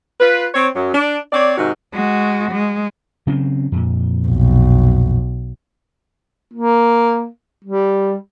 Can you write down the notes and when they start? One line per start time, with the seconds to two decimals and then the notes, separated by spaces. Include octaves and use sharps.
0.20 F4 B4
0.54 C4 C#5
0.76 F#2 F#3
0.94 D4
1.33 C4 C#5 D5
1.58 G#2 C3 D#3 D#4 F#4
1.92 G#3 F#4
2.52 G#3
3.27 C#3 F#3 C4
3.72 F2 A#2
4.27 B1
6.53 A#3
7.64 G3